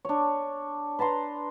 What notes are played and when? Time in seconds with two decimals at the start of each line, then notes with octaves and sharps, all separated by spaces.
0.05 D4 C#5
0.99 B4 A5 A#5 C6